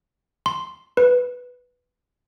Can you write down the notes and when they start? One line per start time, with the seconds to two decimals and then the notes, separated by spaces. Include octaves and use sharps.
0.46 C6
0.97 B4